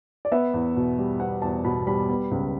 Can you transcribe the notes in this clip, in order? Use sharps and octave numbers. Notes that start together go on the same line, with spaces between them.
D5
B3 E5
E2
B2
G3
B3 F#5
E2 A5
B2 B5
G3 B5
B3
C#2